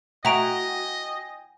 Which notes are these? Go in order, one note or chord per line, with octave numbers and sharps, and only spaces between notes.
F#4 D#5 E5 G5 G#5 A#5 D7